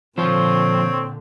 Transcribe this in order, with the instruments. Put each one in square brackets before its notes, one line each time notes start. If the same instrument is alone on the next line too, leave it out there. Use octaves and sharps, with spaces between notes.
[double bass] A#2 D3 [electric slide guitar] F3 C5 [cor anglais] C4 [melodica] C#5